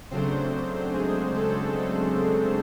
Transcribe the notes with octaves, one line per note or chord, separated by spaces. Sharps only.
C#3 F#3 A3 C4 D4 C5
G#3 G#4
A3 A4
A3 A4